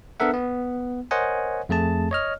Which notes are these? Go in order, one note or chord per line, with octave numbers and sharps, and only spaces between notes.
B3 D4 A4 A#4 E5 F#5
B3
A#4 C5 C#5 D#5 F#5 G#5
F2 A3 G#4 A5
C#5 D#5 F6